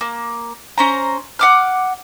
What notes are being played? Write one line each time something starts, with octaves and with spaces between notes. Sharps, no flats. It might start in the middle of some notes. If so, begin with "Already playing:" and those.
A#3
C#4 C5 A#5
F#5 D6 F6